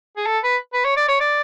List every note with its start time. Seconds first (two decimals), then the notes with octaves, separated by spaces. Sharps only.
0.17 G#4
0.26 A4
0.44 B4
0.73 B4
0.85 C#5
0.97 D5
1.08 C#5
1.20 D5